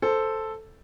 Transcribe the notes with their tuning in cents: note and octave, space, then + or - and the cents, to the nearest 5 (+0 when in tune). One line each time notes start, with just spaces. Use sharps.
A4 +0 C5 +0